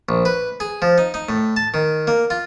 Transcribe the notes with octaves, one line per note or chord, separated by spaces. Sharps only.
A#1
B4
G#4
F3
D#4
D#4
A2
A5
D#3
A#3
F4